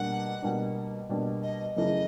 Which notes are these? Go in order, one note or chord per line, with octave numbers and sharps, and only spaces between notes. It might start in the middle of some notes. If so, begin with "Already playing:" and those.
Already playing: B2 G3 A#3 D4 F#5
B2 G3 A#3 D4
B2 G3 A#3 D4
D#5
F#2 C#3 E3 A3 D#5